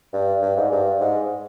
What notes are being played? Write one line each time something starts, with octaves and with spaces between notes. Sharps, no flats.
G2
G2
G#2
G2
G#2